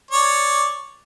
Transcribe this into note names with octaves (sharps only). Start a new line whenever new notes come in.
C#5 D5